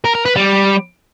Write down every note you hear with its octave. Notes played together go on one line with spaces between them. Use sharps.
A#4
A#4
B4
G3